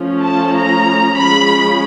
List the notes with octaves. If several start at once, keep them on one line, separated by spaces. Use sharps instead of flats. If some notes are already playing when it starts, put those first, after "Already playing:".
Already playing: F3 A3 C#4
A5
A#5
F3 G#3 C#4 B5